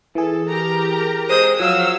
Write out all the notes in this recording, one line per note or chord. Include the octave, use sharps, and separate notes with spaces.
E3 G#4 A4
G4 A#4 A#5
G#3 C5 D#6
F3 F#3 F5 E6